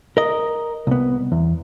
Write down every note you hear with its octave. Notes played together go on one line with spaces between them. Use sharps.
A#4 D#5
C2 B3
E2